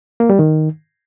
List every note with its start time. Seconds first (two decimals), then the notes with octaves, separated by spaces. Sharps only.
0.20 A#3
0.30 G3
0.39 D#3